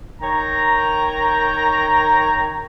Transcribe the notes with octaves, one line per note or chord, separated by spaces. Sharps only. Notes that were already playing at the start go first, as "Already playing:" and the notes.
D#3 C#5 G5 A#5